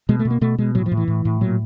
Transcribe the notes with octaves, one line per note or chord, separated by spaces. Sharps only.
B2 G#3
A3
B2
A#3
B2 A3
B2 G#3
A2 F#3
F3
A2
E3
A2
A2
A#2 F#3